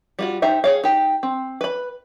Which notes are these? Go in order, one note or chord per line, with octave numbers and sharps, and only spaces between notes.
G3 F4 F#4
D#4 G4 C5 E5
G#4 C#5 F5
D#4 G4
C4
B4 B5